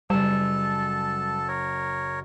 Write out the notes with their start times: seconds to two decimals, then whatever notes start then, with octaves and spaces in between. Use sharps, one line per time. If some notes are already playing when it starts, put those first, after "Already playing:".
0.10 F#1 G3 A4 A5 E7
1.48 A#4 C#5